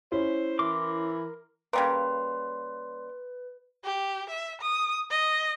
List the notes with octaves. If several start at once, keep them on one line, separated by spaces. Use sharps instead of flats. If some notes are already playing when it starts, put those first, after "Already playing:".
C#4 E4 C5
E3 A#4 C6 D6
C#3 G3 A#3 B4 C6
G4
E5
D#6
D#5